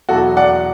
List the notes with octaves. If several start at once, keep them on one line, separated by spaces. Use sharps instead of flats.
E2 B2 F#3 F#4 A4
D5 F#5